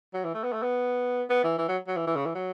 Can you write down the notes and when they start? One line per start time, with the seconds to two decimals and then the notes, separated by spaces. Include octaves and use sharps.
0.14 F#3
0.24 E3
0.34 A3
0.43 B3
0.53 A3
0.63 B3
1.30 B3
1.44 E3
1.58 E3
1.68 F#3
1.87 F#3
1.97 E3
2.07 E3
2.16 C#3
2.26 E3
2.35 F#3